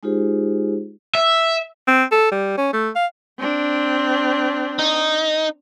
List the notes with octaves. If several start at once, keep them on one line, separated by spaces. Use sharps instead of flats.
G#3 D#4 F4 G4 G#4 C5
E5
C4
A4
G3
C#4
A3
F5
C4 D4
D#4